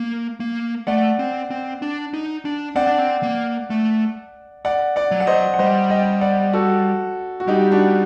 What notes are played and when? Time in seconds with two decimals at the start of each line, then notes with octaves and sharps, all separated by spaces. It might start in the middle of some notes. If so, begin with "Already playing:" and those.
Already playing: A#3
0.40 A#3
0.87 A3 D5 F#5
1.19 C4
1.50 C4
1.82 D4
2.14 D#4
2.45 D4
2.76 C4 D5 F#5
2.87 D4
2.98 C4
3.23 A#3
3.70 A3
4.65 D5 F#5
4.96 D5 F#5
5.11 F#3
5.20 F#5
5.27 C5 D#5
5.54 F#5
5.59 G3 C5 D#5
5.90 D#5 G5
6.21 D5 F#5
6.53 F#4 A4
7.40 F#4
7.47 G3 D#4 G4
7.72 D4 F#4